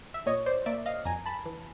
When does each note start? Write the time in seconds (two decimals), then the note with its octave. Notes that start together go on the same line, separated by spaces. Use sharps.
0.14 E5
0.26 A#2 C#5 D#5
0.46 C5 D5
0.66 A#3 D5 E5
0.86 D#5 F5
1.05 F2 G#5 A#5
1.26 A5 B5
1.46 E3